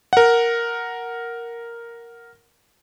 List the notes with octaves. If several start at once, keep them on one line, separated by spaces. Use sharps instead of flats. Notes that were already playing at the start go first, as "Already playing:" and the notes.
A#4 F#5